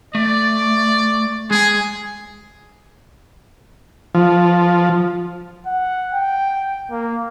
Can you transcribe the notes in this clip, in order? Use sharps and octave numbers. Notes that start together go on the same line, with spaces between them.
A3 D5
G#3 G#4 G#5
F3
F#5
G5
A#3